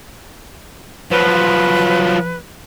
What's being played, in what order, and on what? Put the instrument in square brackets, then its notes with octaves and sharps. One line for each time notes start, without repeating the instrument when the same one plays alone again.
[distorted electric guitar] F3 F#3 [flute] B4